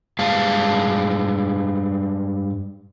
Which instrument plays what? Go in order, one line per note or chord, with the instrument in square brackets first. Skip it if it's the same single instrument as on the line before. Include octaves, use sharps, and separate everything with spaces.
[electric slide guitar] G2 G#3 F5 A5